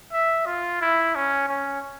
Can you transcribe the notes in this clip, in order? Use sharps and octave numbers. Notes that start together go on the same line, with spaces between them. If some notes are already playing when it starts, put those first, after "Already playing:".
E5
F4
E4
C#4
C#4